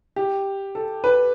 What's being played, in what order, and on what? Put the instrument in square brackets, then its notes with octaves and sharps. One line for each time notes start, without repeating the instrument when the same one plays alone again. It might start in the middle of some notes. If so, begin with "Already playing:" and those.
[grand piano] G4
A4
B4